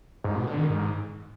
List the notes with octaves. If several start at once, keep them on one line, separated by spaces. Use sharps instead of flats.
G#2
B2
D3
D#3
G#2